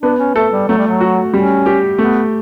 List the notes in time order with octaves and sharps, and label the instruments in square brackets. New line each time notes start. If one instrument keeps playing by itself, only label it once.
[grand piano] B3 [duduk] D4
[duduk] C#4
[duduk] A3 [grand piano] A4
[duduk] G3
[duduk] F#3 [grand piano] A3
[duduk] G3
F#3
[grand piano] F#4
[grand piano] G3 [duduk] C#4
[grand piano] G4
[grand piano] A3 [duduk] B3